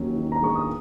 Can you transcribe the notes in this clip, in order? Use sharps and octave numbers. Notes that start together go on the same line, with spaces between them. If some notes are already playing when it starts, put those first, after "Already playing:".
Already playing: D#2 F#3 C#4
D#3
A#5
G#3 C#6
D#6